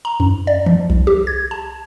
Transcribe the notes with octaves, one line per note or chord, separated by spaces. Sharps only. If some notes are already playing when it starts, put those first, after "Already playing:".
A#5
F#2
D5
F3
C2
G4
G#6
A5